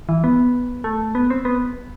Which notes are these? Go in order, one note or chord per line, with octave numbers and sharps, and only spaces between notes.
E3
B3
A3
B3
C4
B3